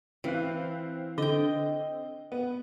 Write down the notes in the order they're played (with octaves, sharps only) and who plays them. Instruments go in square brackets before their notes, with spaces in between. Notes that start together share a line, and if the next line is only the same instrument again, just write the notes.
[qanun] E3 [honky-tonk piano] C4 F5 F#6
[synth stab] D3 [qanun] D#5 G5
[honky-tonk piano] B3